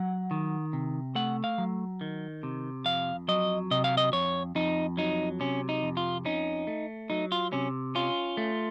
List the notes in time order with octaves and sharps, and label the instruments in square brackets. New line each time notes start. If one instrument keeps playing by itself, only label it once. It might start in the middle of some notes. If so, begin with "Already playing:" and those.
Already playing: [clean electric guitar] F#3 F#5
D#3
C3
A3 F#5
F5
F#3
D#3
C3
F2 F5
F#3 D#5
C3 D#5
F5
D#5
F2 C#5
F2 D#4
F#3 D#4
C3 C#4
D#4
F2
F4
C#4 D#4
A3
F#3 D#4
F4
C3 C#4
C#4 F4
A3